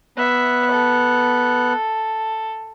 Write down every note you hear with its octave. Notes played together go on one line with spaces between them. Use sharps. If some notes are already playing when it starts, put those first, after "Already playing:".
B3 E5 F#6
A4